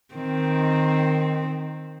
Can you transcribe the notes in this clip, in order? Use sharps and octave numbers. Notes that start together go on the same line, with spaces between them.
D#3 C4